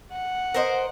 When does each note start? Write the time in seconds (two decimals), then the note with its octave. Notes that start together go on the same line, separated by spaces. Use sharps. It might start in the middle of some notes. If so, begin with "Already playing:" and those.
0.12 F#5
0.54 A#4 C5 D#5